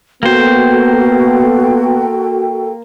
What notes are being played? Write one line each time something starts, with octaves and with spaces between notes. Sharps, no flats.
A#3 B3 F#4 A4 C5 G5